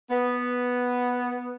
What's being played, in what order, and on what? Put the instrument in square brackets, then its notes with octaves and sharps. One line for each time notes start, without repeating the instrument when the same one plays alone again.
[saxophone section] B3